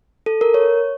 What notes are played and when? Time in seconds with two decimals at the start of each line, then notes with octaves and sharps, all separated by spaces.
0.26 A4
0.41 A#4
0.54 C#5